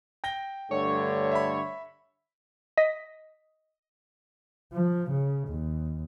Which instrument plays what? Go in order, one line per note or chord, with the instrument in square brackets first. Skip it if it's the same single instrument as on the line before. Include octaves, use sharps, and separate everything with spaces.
[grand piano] G5 A#6 G7
[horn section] G2 D3 A3 [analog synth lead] C#5
[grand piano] E5 B5
[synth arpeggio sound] D#5 A#6 B6
[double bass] F3
C#3
D#2